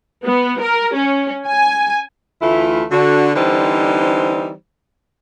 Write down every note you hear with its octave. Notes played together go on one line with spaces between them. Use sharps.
B3
A#4
C#4
G#5
D2 E3 A3 E4 F4
D3 F#4
D3 E3 G3 C4 D#4 C5